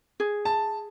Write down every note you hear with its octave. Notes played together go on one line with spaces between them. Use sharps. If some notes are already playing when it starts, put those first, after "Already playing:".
G#4
A5